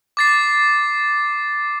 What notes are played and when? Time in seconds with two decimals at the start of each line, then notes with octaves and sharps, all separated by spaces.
0.17 D6 A6 C7